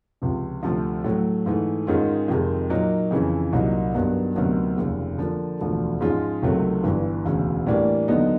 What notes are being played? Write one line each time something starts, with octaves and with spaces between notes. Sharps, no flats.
C#2 C3 F3
D2 C3 F3 A3 C4
A2 F#3 A3
G#2 E3 A3
G#2 D#3 G#3 C#4 F4
F2 C3 D#3 G#3
A#2 F#3 A#3 D#4
F2 C#3 E3
C2 A#2 F#3 A#3 D#4
G2 D#3 F#3 B3
D2 C3 D#3 F#3 B3
F1 D#2 C#3
D3 F3 A#3
E1 D2 D3 F3 A3
G#2 F3 G#3 C#4 F4
C#2 C3 D#3 F#3 A3
G1 G2 E3
E1 D2 C#3
A2 E3 G3 A#3 D4
D#2 D3 F#3 B3 D#4